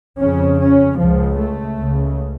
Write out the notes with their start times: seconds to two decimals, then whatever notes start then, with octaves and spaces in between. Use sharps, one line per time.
0.20 F2 C#3 C#4
0.59 C#4
0.99 C#2 C#3 F3
1.38 A3
1.77 C#2 C#3